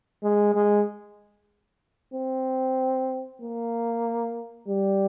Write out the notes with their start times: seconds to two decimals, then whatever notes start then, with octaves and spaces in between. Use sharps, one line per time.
0.23 G#3
0.54 G#3
2.14 C4
3.41 A#3
4.68 G3